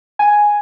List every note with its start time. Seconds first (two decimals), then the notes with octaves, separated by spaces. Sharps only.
0.19 G#5